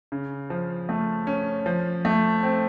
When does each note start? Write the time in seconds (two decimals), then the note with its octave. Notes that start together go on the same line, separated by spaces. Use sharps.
0.12 C#3
0.50 F3
0.89 A3
1.27 C#4
1.66 F3
2.05 A3
2.43 C4